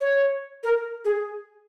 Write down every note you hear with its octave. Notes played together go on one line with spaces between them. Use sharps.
C#5
A#4
G#4